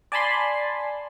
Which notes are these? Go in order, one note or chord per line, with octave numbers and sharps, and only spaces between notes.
D5 G#5 A5 B5 C6